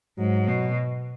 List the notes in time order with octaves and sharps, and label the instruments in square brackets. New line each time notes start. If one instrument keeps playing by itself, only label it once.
[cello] G#2 [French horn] F#3
[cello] B2